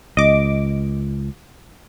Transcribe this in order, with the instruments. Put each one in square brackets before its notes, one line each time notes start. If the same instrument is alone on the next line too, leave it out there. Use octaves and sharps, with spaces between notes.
[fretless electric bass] C#2 [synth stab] D#5 D6